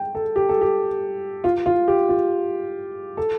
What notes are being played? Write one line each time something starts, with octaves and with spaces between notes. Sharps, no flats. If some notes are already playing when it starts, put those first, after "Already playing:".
Already playing: G5
A4
G4
A4
G4
F4
F4
G4
F4
A4